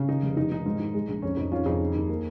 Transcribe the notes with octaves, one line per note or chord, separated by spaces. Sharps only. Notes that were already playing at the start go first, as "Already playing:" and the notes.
Already playing: C#3
D#3 D#4
F1
D#3 D#4
D#3 D#4
G#2
D#3
G#3
A#1
F2 C#4
F2 D#4
D#3 C#4 F4
F2 D#4 G#4
D#3
D#2
A#3